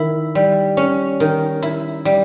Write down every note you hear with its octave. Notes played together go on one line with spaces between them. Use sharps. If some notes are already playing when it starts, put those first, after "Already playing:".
Already playing: D#3 E4
G3
C#4
D#3
E4
G3